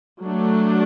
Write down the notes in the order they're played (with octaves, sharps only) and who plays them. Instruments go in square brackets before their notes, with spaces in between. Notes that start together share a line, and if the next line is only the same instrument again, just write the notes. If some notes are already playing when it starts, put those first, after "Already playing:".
[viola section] F#3 A3 D4